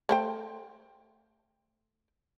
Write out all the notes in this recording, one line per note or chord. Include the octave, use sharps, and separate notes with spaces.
A3 C5 G5